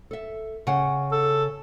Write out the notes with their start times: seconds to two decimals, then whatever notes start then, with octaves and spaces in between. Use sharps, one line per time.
0.11 A4 E5
0.67 C#3 F#5
1.12 A4